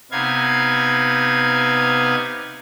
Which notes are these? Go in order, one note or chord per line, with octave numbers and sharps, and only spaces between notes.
C3 B3 D#4 F5 G#6